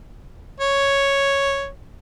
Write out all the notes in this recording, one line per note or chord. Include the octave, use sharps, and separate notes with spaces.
C#5